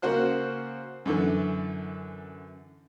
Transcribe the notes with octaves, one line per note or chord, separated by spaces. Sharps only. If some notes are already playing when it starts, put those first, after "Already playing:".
C#3 A#3 F#4 C5 F#6
F#2 D3 E3